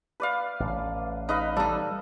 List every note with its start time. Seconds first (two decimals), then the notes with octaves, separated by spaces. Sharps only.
0.20 B4 D5 F5
0.60 A1
1.29 D#4 B4 D#5 F5
1.57 G3 D#4 A4